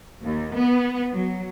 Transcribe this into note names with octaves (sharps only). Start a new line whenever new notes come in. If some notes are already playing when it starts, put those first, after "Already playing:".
D#2
B3
F#3